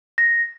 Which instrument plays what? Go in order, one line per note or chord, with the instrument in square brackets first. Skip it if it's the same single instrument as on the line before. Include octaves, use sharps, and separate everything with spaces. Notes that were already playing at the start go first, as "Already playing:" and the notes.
[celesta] A#6